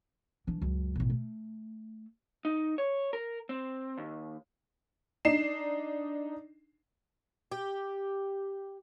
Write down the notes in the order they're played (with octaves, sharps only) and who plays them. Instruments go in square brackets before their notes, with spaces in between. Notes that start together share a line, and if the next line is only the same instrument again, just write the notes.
[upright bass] E3 D4
C#2 F#2
A1 B2
A3
[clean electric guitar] D#4
C#5
A#4
C4
D#2
[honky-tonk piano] D4 D#4 C7 E7
[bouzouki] G4